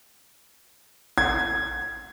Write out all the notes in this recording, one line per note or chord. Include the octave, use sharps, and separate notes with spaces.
G#6